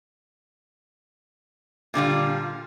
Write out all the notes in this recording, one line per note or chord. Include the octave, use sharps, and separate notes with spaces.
A#2 D3 G3 F4